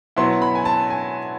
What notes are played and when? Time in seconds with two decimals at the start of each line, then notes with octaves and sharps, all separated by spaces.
0.16 B2 F#3 B3 E4 C6
0.42 B5
0.55 G#5
0.65 A5
0.90 G#5